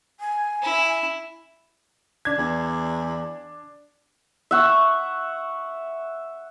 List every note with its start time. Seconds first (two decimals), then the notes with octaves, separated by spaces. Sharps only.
0.20 G#5
0.62 E4
2.25 D4 G#6
2.38 E2
4.51 E5 F#5 C#6